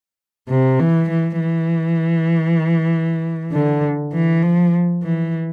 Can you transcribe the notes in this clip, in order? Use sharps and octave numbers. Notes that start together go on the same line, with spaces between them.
C3
E3
E3
E3
D3
E3
F3
E3